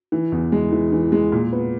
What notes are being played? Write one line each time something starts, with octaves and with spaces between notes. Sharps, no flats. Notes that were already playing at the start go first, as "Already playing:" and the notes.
E3
E2
G#3
E3
E3
G#3
A#2
B3